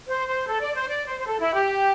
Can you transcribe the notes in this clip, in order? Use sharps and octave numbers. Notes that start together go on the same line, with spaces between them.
C5
C5
A4
D5
C5
D5
C5
C5
A4
E4
G4